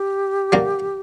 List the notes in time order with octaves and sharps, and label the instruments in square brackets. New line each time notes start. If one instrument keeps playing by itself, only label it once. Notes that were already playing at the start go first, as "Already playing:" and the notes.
Already playing: [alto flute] G4
[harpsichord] D3 F#3 A#3